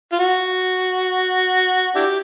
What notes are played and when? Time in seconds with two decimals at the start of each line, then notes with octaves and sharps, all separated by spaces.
0.13 F4
0.20 F#4
1.95 D4 E4 G4